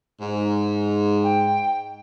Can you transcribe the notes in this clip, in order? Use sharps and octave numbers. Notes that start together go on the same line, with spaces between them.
G#2
G5